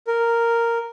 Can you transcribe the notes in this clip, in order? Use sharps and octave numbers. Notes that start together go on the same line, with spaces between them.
A#4